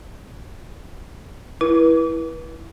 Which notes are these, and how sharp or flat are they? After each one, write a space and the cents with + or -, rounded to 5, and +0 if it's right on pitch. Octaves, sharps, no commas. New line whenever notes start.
E4 +0 B4 -30